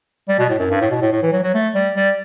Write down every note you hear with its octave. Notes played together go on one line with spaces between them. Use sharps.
G3
B2
A2
F#2
G2
A2
B2
A2
A2
E3
F#3
F#3
A3
G3
G3